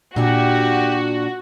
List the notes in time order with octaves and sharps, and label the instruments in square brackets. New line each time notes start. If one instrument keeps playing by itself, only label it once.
[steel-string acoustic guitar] A#2 D4 [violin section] F#4 [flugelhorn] G4